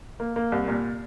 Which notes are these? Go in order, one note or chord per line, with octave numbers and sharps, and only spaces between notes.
A#3
A#3
C2
A#2